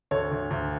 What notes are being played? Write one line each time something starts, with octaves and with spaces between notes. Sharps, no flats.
D2 A4 C#5
D2
D2